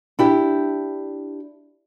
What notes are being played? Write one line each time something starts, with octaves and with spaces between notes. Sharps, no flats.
D4 E4 G4